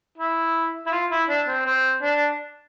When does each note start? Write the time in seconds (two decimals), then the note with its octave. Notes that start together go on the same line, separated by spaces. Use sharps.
0.18 E4
0.86 E4
0.92 F4
1.10 E4
1.28 D4
1.47 C4
1.65 C4
2.02 D4